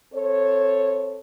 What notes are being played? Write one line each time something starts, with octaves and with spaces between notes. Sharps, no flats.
C4 A4 C5 C#5